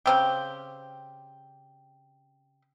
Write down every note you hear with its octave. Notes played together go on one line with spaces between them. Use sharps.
C#3 C4 G4